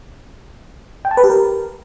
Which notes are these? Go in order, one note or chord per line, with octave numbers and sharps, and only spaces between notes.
G5
A5
B4
G4
A#4